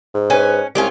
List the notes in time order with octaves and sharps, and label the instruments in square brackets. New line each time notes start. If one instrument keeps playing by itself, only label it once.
[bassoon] G#2
[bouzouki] C#4 [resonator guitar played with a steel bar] B4 G#5
[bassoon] C2 [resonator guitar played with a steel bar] G#3 [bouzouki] C#4 F4 G4